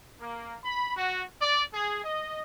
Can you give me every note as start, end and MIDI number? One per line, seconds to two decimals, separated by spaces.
0.20 0.56 58
0.63 0.93 83
0.95 1.24 66
1.39 1.63 74
1.72 1.98 68
2.02 2.43 75